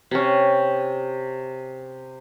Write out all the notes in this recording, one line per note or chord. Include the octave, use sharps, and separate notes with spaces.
C3 C#4